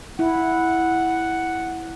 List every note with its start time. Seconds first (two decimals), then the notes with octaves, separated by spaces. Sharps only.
0.19 E4 F#5